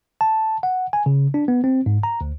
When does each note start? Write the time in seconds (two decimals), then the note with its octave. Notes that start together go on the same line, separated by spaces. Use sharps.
0.21 A5
0.63 F#5
0.93 G#5
1.06 C#3
1.34 D4
1.48 B3
1.64 C4
1.86 G#2
2.03 A#5
2.21 D2